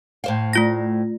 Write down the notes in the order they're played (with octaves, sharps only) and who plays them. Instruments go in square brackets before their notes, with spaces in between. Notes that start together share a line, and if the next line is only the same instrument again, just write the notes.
[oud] A2 C5 F5
[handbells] A3 F4 A#6